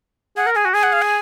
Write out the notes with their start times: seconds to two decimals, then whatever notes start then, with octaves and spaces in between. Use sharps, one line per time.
0.37 G#4 F#5
0.46 A#4
0.55 G#4 G#5
0.65 F#4
0.74 G#4 G#5
0.83 F#5
0.93 F5
1.02 G#5